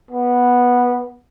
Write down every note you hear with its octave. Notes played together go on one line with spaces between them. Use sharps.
B3